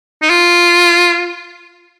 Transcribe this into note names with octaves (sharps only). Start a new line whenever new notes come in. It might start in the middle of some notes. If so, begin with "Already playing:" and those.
D#4
F4